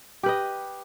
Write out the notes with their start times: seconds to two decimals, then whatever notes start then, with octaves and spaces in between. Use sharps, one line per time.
0.23 G4
0.26 B4
0.29 D#5